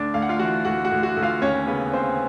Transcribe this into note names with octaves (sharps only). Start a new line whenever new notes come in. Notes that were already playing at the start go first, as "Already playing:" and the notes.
Already playing: D2 D4 D5
D2 F5
F#5
F4 F5
E3 F#4 F#5
D2 F#4 F#5
F#4 F#5
D2
F#4 F#5
D2
F4 F5
D#2 C#4 C#5
C#3 B3 B4
C#3 C4 C5